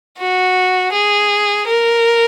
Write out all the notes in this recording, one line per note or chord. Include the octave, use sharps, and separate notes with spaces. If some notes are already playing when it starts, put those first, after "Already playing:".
F#4
G#4
A#4